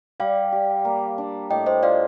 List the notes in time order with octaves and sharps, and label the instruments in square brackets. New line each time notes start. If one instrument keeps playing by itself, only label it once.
[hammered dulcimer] G3 [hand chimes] D5 F5
[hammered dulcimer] G4
A#3
D4
[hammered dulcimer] A2 [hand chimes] D#5 G5
[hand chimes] C5 D#5
[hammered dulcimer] F4 [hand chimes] D5 F5